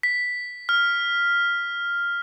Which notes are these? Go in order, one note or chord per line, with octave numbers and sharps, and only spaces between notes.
B6
F6